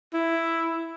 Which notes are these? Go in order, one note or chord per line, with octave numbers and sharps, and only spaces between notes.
E4